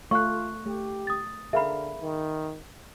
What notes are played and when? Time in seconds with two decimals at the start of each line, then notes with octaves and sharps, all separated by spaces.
0.11 A3 F4 F5 C#6 F#6
0.66 A3 G4
1.07 D#6 A6
1.53 D3 G#4 A#4 E5 F5 B5
2.01 D#3